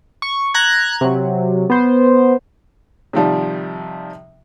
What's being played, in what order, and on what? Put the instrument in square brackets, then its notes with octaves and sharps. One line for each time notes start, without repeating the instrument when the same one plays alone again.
[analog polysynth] C#6
A#5 F#6 G#6
C3 F#3
B3 C5
[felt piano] C3 D#3 F3 G3